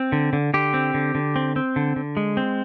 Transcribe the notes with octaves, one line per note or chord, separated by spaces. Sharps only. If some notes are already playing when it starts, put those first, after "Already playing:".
Already playing: C4
D3
D3
D3 G4
C4
D3
D3
C4
C4
D3
D3
G#3
C4